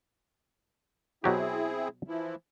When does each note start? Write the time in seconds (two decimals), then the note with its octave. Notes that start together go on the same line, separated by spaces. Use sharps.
1.24 B2 F#3 C4 E4 G4 G#4
2.08 E3 F3 E4